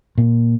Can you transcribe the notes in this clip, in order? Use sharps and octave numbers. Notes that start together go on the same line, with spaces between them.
A#2